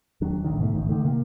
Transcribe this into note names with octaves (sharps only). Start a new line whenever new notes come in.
D#1 D#3 F#3 D4
A1 B2 D3 D#3
G#2 B2 A3
A1 A#2 D#3
D3 D#3 A3
C3 A#3